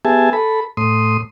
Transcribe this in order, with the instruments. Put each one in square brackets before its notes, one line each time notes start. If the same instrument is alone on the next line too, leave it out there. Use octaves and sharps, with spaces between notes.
[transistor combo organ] B3 G4 G#4 E5 G#5 A5
A4 B5
A2 C6 D#6